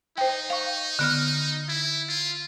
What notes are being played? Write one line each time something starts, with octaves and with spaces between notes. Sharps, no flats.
D#4 C5 G5
F5 C#6
D3 B3 F6
E4
F4